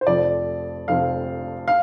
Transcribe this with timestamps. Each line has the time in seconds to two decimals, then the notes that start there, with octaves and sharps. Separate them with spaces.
0.01 C5
0.06 F1 F2 F3 C4 D5
0.88 F1 F2 F3 C4 F5
1.68 F5